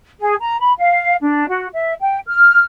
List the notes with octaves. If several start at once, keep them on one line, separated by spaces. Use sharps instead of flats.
G#4
A#5
B5
F5
D4
F#4
E5
G5
F6